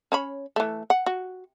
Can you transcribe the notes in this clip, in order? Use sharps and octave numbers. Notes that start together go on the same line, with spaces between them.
C#4 C#5 B5
E3 A3
F#5
F#4